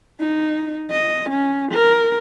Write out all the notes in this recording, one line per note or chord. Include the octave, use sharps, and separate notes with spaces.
D#4
D#5
C#4
A#4